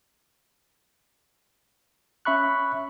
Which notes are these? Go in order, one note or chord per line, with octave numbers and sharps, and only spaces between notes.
C#4 E5 B5 C#6 F#6